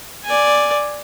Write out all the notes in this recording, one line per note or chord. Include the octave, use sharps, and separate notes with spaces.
D5 G#5